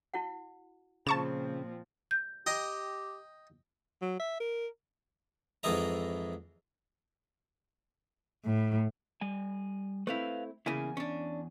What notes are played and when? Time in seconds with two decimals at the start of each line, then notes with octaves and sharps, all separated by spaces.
0.14 E4 F#4 F#5
1.07 A#2 C#3 F3 C4 A5 C#6 E7
2.11 G6
2.46 G4 D#5 G5 A#5
4.02 F#3
4.20 E5
4.40 A#4
5.63 F2 G#2 E3 E4 D#5 A#5
8.45 A2
9.21 G3 G#5
10.07 A3 C4 E4 B4 F5
10.66 E2 C#3 A#3 E4 G#5
10.97 C#4 D4